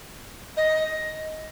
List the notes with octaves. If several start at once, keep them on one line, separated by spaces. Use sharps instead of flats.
D#5